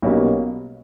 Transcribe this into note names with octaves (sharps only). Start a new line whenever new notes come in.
B1 B2 G3 A#3 C#4